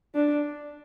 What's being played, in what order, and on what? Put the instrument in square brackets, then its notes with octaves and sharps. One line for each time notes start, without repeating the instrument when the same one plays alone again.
[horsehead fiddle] D4